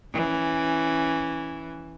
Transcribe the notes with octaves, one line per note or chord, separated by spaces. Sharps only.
E3 C#4